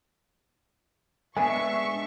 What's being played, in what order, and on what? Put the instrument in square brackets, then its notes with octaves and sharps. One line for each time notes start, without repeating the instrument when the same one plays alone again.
[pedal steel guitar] G#3 D4 B4 [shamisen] B3 G#5 [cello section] E5 [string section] C#6